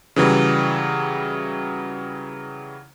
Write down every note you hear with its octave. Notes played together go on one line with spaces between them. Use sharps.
C#3 E3 F#3 G3